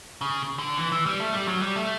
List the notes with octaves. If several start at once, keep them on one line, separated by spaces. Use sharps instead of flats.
C#3
D3
E3
E3
G3
A3
G3
F#3
G3
A3